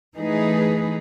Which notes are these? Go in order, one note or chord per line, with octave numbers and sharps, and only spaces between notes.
E3 A3 D#4 G#4 B4